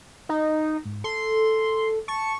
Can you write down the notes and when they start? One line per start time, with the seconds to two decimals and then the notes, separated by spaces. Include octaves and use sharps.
0.29 D#4
0.85 G#2
1.04 A4 C6
2.08 A5 C#6